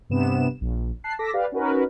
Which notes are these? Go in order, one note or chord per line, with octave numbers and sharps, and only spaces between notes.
G2 C3 B3 E7
A#1
A5 F#6 C7
A4 A5 D6 A#6 B6
G4 B4 D5 F5
C#4 D#4 F#4 A#4 B4